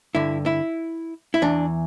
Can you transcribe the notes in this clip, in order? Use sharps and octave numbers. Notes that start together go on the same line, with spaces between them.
G2 D3 E4
E4
E4
E2 E3 D4